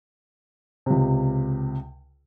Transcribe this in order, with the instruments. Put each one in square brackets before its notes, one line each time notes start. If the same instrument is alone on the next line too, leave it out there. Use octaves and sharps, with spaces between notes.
[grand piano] C#2 C3